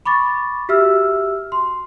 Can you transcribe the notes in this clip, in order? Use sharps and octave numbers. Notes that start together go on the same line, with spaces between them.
B5 C#6 D6 A6
F#4 G4 E5 E6 F6
C6